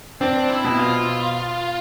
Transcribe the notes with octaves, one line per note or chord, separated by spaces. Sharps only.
C4 D4
E4
B2
F4